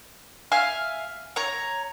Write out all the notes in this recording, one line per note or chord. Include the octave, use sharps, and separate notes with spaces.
E5 F5 G#5 F6
C#5 A#5